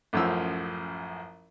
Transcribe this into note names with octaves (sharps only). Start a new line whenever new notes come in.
A1 F#2 F3 E6